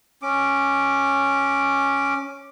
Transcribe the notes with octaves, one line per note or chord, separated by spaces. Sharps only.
C#4 D6